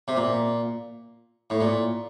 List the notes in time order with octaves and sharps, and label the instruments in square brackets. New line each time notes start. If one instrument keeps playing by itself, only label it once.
[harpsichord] C3
A#2
A2
A#2